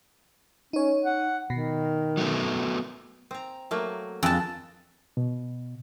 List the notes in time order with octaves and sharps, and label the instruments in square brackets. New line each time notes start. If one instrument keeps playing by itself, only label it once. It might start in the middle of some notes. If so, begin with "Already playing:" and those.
[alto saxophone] C#4 [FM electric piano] D#4 C#5
[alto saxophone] F#5
[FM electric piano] B2 [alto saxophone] D#3
[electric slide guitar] F#3 A3 B3
[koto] C4 A#5
F#3 A3 A#3
[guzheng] F2 A5 [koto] G#3 G5
[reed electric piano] B2